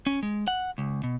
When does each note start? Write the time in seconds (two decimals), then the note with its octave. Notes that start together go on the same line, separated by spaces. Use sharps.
0.07 C#4
0.23 G#3
0.48 F#5
0.78 C#2
1.03 B2